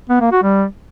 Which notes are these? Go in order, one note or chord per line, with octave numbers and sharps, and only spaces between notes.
B3
A#3
F#4
G3